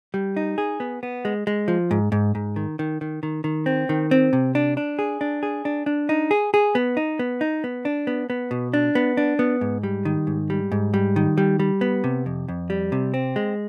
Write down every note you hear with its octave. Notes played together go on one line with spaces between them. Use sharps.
G3
D#4
G#4
B3
B3
G#3
G#3
F3
G#2
G#2
G#2
D#3
D#3
D#3
D#3
D#3
C4
D#3
C4
C3
D4
D4
G#4
D4
G#4
D4
D4
D#4
G#4
G#4
B3
D#4
B3
D#4
B3
D4
B3
B3
B2
D4
B3
D4
B3
G#2
G3
D#3
G#2
G3
G#2
G3
D#3
G3
G3
B3
C3
F2
F2
G3
C3
C4
G#3